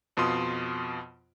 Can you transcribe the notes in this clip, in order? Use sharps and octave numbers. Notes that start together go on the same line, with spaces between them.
F2 B2 F4 C6 D#6